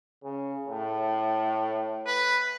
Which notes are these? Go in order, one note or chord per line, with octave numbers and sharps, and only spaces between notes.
C#3
A2
B4